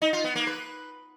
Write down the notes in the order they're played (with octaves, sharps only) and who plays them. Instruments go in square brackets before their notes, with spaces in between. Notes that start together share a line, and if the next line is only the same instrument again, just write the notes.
[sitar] D#4
F4
B3
A#3
B4